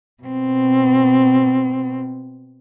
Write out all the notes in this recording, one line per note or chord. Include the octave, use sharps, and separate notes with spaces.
B2 C4